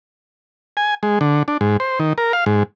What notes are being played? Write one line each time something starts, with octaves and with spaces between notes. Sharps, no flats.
G#5
G#3
D3
D4
G#2
C5
D#3
A#4
F5
G#2